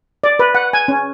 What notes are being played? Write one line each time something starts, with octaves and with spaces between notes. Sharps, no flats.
D5
B4
F#5
G#5
C#4